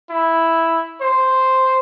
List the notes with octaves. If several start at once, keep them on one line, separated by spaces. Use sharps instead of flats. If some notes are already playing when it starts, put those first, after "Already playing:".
E4
C5